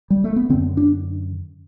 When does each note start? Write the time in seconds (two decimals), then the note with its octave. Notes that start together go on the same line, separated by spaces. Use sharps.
0.10 G3
0.24 A3
0.36 B3
0.50 D3 C4
0.54 F#2
0.77 D4